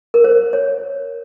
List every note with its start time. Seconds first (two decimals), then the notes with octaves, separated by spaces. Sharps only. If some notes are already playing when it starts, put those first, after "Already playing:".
0.14 A#4
0.24 C5
0.53 C#5